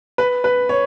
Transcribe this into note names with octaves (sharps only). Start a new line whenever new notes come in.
B4
B4
C#5